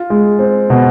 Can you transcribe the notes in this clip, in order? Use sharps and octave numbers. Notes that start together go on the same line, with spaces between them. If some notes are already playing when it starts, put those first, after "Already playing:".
Already playing: F4
G#3
C4
B2